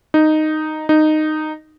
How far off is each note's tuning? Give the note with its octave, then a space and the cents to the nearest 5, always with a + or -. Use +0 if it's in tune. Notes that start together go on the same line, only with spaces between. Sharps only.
D#4 -5
D#4 -10